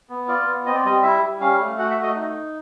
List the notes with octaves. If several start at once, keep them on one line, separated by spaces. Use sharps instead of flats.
B3
F4 D5
B3
C4 D#5
D5
G3 D#5
E4 E5
G3
C#4 F5
A3
F#4 F#5
E5
A3
D#5
D#4